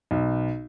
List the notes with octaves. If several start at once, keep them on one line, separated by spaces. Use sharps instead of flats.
B1